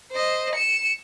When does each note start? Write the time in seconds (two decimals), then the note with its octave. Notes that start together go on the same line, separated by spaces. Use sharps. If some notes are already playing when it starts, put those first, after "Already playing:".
0.11 C5 D#5
0.55 C#7 E7